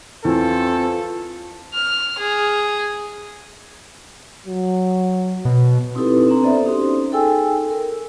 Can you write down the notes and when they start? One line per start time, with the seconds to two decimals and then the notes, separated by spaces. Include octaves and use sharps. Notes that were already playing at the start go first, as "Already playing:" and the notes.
0.25 E2 C4 F4 A4
1.74 F6
2.18 G#4
4.46 F#3
5.45 B2
5.95 C4 D#4 E4 G4 A4 B4
6.29 C4 D4 A#5 C6
6.43 B3 A4 C5 D5 E5
6.65 C#4 D#4 F#4 G4 C5 C6
7.11 D#4 G#4 A4 G5 G#5 E6
7.71 A#4